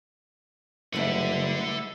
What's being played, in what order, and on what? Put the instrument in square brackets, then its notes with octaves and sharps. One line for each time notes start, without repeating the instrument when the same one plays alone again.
[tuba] F#1 [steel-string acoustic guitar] G3 A3 D#4 [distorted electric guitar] A4 F#5 [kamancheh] B4 E5